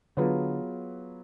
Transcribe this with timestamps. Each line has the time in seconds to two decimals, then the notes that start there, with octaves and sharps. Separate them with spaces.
0.17 D3 F#3 B3 F4 G#4 B4